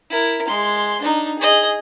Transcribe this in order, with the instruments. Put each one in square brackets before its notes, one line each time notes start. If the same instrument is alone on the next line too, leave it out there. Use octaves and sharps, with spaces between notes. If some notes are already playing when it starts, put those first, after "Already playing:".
[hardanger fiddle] E4 A#4
G#3 C6
D4 D#4
G#4 D#5